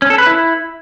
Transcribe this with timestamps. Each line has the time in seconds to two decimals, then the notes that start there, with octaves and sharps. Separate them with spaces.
0.02 C#4
0.10 A4
0.18 B4
0.27 E4